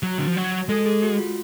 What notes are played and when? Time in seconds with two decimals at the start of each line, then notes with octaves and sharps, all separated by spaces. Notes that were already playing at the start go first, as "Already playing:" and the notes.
0.03 F#3 F#4
0.18 D3
0.27 F3
0.36 F#3
0.69 G#3 A4
0.86 G#4
1.03 F#4
1.18 F4